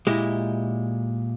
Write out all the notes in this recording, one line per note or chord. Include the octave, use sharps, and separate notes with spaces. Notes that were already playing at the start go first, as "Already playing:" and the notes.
A#2 G#3 E4 G4